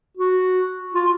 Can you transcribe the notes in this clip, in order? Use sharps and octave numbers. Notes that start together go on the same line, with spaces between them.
F#4
F4